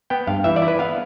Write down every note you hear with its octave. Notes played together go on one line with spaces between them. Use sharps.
B3 G5
G2 F5
E3 E5
D5
E4
B4
B3 F5